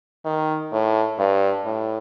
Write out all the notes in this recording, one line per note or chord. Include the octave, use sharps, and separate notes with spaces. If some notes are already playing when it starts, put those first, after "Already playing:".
D#3
A2
G2
A2